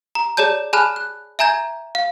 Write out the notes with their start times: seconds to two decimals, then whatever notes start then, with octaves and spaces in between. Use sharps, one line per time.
0.15 A#5
0.37 G#4 C#5 D5 A5 G6
0.73 G#4 G#5 A5 B5 F6 F#6
0.96 F#6
1.39 E5 G#5 A#5 G6 G#6
1.95 F5